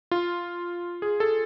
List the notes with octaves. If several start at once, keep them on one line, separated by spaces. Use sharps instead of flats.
F4
G#4
A4